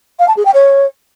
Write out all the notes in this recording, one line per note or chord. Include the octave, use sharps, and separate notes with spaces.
F5
A5
G#4
G5
C#5